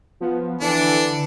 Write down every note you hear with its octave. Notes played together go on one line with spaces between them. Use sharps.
F3 B3
D3 E3 D4 C#7